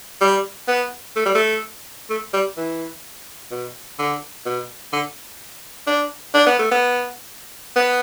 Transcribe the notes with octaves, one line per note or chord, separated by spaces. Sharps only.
G3
B3
A3
G3
A3
A3
G3
E3
B2
D3
B2
D3
D4
D4
B3
A3
B3
B3